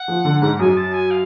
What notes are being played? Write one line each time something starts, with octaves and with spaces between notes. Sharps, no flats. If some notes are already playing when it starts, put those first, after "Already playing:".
Already playing: F#5
F3
D3
G#2
F#2 G#5
A5
G#5
F5